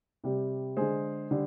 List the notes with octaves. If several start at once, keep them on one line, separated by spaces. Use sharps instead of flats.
C3 G3
D3 G#3 G#4 C5
D3 G3